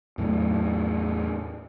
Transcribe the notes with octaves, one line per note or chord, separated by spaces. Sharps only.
E2 A2 F#3 A3